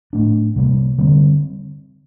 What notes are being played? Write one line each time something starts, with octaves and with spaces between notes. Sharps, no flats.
A2 A3 D4
C3 G3 A#3
D3 G3 C4